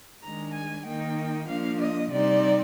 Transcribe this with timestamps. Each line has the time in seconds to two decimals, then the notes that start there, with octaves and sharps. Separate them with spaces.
0.22 D#3 G#3 D4 A#5
0.53 G#5
0.84 D#3 A#3 D#4 G5
1.47 F3 A#3 D4 F5
1.79 D#5
2.10 C3 G3 C4 D#4 D5